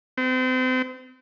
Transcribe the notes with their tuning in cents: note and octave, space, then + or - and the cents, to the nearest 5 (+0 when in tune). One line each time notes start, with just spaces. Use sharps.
C4 -35